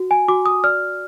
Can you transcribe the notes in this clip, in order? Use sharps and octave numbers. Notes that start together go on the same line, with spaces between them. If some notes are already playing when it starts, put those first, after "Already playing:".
Already playing: F#4
G#5
F#4 D6
D#6
D5 F6